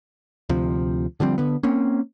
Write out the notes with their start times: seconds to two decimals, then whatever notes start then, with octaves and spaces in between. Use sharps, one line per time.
0.49 D2 C3 F3
1.20 D3 F3 G3 C4
1.38 D3 B3
1.63 A#3 C4 C#4